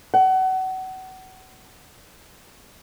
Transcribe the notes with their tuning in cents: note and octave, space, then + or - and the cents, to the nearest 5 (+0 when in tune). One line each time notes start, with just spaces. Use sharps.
F#5 +30